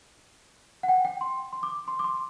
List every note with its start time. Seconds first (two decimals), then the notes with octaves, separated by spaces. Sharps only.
0.83 F#5
0.88 G5
1.05 G5
1.21 C6
1.53 C6
1.63 D6
1.88 C6
1.99 D6
2.04 C6